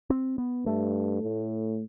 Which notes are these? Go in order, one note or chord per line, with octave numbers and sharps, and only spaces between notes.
C4
B3
G2 A3
A2